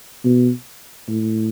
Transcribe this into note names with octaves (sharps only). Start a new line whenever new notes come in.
B2
A2